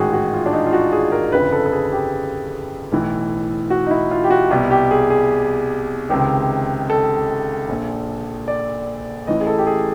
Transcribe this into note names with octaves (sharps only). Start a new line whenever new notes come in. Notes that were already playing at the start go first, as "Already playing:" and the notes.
Already playing: A1 G#2 D#3 F#4 G#4
F#4
F4
D4
D#4
F4
F#4
G#4
A#4
G1 F2 C#3 B4
A4
A4
G#4
G4
B1 A2 E3
F#4
D#4
E4
F4
G4
F#4
C2 B2 G4
G4
G#4
G#4
C#2 C3 D#3
A4
A#1 A#2
D5
A1 A2 E3 D#5
G#4
A4
G4
G#4